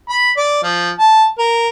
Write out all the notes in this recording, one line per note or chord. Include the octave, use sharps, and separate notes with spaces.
B5
D5
F3
A5
A#4